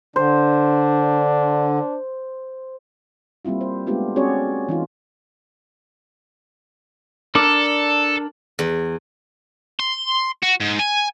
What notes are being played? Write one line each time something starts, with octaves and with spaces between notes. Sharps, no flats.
D3 D4 C5
G3 A#3 C4 E4 F4
C5
G#3 A3 B3 D4 F4 G4
C4 C#4 F#4 G#4 C#5 D5
E3 D#4 F4
D4 A4 A#4 D5
E2
C6
F#4
G#2
G#5